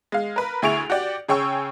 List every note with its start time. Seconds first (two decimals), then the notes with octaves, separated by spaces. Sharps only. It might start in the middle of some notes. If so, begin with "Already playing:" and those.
0.12 G#3 F5
0.36 A#4 B4
0.62 D2 E4 G#4 C#6 D7 F7
0.90 F#4 G4 D5
1.28 C#3 G#4 C#5 G5 C#6 E6